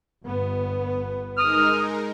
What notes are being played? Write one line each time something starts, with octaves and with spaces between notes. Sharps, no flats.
G1 B3
G#3 D#4 A#4 D#6 F6